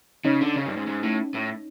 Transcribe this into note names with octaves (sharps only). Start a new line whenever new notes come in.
C#3 C#4 D#4
D3
C#3
G2
G#2
G#2
A2
A2